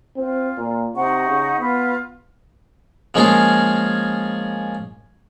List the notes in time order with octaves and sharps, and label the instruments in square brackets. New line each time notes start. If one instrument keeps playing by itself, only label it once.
[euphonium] C4 [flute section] F4
[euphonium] A#2
[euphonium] C3 [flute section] D#4 F#5 C#6
[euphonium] C#3
[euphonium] B3 [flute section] F4 B4
[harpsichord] F3 G#3 A#3 C#4 F4 G#4